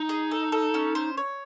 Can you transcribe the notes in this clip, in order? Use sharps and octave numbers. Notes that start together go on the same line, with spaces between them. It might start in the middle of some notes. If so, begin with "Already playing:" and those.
Already playing: D#4
G#4
A4
A4
C#4
C5
C#5